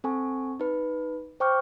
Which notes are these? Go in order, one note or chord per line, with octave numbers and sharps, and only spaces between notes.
C4 A4 G#5 C#6
D#4 B4
C5 G5 C#6 D6 F6 G6